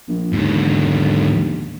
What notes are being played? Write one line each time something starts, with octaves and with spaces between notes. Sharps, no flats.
A#1
D#2 G#2 D3